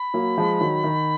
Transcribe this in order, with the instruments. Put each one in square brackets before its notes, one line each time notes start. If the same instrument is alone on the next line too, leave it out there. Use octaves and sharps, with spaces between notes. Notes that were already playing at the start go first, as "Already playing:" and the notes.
Already playing: [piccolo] B5
[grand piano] F#3 A#3
F3 G#3
D#3 F#3
D#3